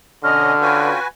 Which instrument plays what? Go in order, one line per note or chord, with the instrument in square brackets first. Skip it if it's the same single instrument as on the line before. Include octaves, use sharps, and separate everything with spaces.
[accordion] B2 C#4 D#5 [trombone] D3 [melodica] F#4 [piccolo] F6
[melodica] C#4 F4 G5 [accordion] F#4 B4 G#5